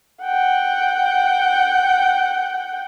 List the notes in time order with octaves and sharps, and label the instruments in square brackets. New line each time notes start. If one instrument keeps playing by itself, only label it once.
[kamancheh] F#5 G5